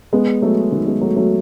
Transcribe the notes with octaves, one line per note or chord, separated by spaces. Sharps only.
G#3 B3
F#3 A3
D#3 F#3
G#3 B3
F#3 A3
F#3 A3